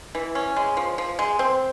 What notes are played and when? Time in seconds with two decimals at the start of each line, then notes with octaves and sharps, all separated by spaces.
0.15 E3
0.35 C#4
0.56 G#3
0.77 F3
0.98 F3
1.19 G#3
1.39 C4